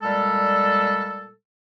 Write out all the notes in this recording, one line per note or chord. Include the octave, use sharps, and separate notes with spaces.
A#2 G3 G#3 A4